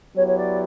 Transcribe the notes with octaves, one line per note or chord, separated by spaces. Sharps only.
F#3 B3 E4 G4 C#5
C#5
D5